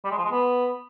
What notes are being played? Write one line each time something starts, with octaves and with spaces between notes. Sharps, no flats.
G3
G#3
F3
G#3
B3